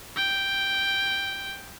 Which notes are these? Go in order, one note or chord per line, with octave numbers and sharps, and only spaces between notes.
G5